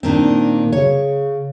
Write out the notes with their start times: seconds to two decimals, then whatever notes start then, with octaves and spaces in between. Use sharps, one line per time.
0.03 A#2 D#3 C4 D4
0.73 C#3 C#5